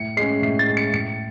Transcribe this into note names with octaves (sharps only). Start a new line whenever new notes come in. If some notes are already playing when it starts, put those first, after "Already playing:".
Already playing: A2 C#7
G#3 C#4 C7
A2 C7
A6
G#3 C#4
C#7
A2 C#7